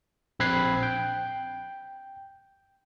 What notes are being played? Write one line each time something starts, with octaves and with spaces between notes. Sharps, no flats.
A#1 C4 B5 F#6 G#6 C7
G5